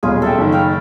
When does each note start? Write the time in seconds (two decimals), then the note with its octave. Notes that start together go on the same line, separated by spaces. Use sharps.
0.03 D#1 B1 C#4 F4 G#4
0.22 A4 E5 G5
0.38 F#1 D#3
0.52 F5 G5 B5